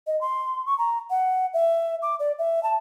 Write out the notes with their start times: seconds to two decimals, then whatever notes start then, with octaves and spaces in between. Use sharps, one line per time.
0.07 D#5
0.21 C6
0.66 C#6
0.78 A#5
1.10 F#5
1.53 E5
2.02 D6
2.19 D5
2.38 E5
2.63 A5